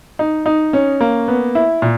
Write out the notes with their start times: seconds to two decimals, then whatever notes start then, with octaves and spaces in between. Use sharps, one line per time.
0.19 D#4
0.46 D#4
0.73 C#4
1.01 A#3
1.28 B3
1.55 E4
1.82 A#2